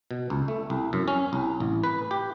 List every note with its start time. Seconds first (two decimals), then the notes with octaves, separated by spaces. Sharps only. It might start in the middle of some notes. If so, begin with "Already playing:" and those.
0.11 B2
0.30 C#2
0.48 A3
0.70 C2
0.93 F#2
1.08 C#4
1.33 C2
1.60 A1
1.84 B4
2.11 G4